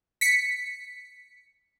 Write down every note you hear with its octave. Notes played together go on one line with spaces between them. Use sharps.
B6 C#7